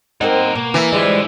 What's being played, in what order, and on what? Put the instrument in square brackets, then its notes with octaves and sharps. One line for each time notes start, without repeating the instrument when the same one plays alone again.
[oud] A#3 C4 D#4 [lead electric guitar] A#4 F#5
[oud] B2 [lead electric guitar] A#3
[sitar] E3
[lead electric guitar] D3 E4 [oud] F3 G3 G#3